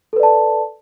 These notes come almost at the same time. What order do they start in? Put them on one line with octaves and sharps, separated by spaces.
A4 B4 D5 A5